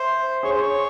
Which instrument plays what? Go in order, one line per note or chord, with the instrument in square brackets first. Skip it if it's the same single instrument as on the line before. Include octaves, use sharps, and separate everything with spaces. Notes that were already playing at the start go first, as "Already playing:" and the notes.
Already playing: [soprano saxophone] C5 [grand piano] E5
[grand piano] G#4 [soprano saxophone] C#5
[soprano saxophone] C5
C#5